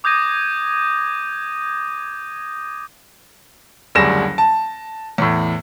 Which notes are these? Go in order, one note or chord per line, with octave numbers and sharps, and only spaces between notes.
D6 D#6 G6 G#6 A#6 D#7
F#1 D2 G3 G#4 A#6 E7
A5
E2 A2